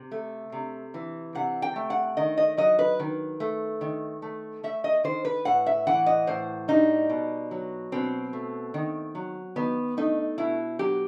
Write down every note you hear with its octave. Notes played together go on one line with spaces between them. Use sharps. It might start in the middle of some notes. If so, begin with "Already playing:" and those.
Already playing: C3
A3
C3
E3
C3 F#5
G5
A3
F#5
D#3 D#5
D#5
F#3 D#5
B4
D#3
A3
D#3
A3
A3 E5
D#5
D#3 C5
B4
A2 F#5
E5
E3 F#5
D#5
A2 C5
G3 D#4
B2
F#3
B2 C4
A3
D#3
F#3
D#3 B3
A3 D#4
B2 E4
F#3 G4